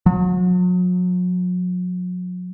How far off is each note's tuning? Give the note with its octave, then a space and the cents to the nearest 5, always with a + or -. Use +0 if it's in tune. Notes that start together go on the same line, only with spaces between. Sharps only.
F#3 -40